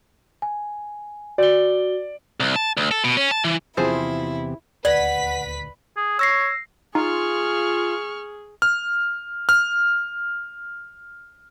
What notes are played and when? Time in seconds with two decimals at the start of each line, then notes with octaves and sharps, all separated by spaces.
0.42 G#5
1.38 F#4 D5 G7
2.40 C2
2.56 A5
2.77 D2
2.91 A4
3.04 B2
3.17 C#4
3.31 A5
3.44 E3
3.77 E2 C3 F3 C4 E4 F4 G#4 C5
4.85 D#1 D2 B4 D5 F#5 B6
5.97 G#4
6.19 C#5 E6 A#6 C7
6.95 D#4 F4 G#4 C#6 F6
8.62 F6
9.49 F6